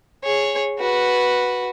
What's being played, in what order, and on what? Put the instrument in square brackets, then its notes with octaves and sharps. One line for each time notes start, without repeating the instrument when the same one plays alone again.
[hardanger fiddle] G#4 C#5
F#4 B4